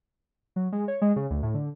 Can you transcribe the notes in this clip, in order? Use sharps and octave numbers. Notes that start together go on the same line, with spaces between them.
F#3
G#3
C#5
G#3
C#3
D2
A2
D3